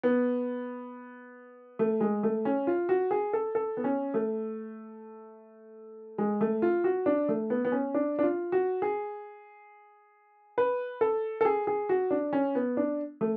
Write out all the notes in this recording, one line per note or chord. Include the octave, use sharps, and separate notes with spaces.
B3
A3
G#3
A3
C#4
F4
F#4
G#4
A4
A4
B3
C#4
A3
G#3
A3
F4
F#4
D4
A3
B3
B3
C#4
D4
D4
F4
F#4
G#4
B4
A4
A4
G#4
G#4
F#4
D4
C#4
B3
D4
A3